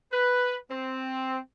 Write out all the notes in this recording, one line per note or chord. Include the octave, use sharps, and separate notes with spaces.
B4
C4